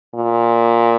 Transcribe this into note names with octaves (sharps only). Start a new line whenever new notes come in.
A#2